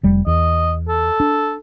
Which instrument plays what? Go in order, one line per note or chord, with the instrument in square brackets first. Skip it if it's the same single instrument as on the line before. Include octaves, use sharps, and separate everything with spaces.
[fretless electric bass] F1 G3
[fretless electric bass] E2 [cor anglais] D#5
[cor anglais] A4
[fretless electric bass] D4